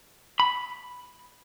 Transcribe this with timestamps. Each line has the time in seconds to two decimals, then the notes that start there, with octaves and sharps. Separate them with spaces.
0.40 B5